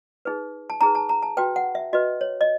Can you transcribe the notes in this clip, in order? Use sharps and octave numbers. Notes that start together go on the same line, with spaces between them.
D#4 G#4 B4
A5
D#4 G#4 B4 A#5
A5
A#5
A5
F#4 B4 G5
F#5
E5
F#4 B4 D#5
C#5
D#5